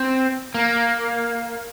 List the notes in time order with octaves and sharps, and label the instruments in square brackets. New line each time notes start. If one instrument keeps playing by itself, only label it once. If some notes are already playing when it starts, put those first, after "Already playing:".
Already playing: [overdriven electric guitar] C4
A#3